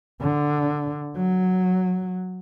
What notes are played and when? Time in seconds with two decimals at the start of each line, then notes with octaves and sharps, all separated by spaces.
0.21 D3
1.16 F#3